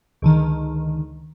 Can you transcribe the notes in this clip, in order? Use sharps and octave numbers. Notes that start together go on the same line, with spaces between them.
C#2 D3 D#3